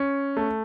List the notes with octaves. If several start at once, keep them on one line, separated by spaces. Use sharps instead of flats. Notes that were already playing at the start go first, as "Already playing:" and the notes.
Already playing: C#4
A3